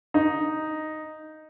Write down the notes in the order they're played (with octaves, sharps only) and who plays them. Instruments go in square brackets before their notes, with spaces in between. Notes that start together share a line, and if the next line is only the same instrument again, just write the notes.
[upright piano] D#4